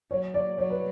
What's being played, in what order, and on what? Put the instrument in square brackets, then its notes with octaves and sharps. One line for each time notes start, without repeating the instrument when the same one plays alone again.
[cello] F#3 [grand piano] C#5
[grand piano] D5
[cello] F#3 [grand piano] C#5
[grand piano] B4